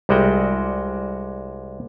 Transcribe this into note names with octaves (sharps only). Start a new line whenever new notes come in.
C2 G3 G#3 F#4 G5